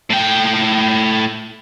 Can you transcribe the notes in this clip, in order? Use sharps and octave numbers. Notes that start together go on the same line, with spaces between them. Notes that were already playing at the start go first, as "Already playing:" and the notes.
A2 G5